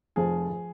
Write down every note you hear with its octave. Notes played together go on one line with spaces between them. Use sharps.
F1 F2 F3 G#4
F3